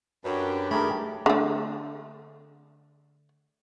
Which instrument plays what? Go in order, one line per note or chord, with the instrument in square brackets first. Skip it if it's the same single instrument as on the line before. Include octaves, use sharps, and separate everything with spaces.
[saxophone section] F#2 [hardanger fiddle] D4 G4 [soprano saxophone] B4
[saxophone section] G2 D#3 C#5 [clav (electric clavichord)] A3 G#4 A#4 [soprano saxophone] B5
[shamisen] D3 A3